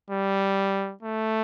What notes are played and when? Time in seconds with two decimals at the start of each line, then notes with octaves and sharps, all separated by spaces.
0.11 G3
1.03 A3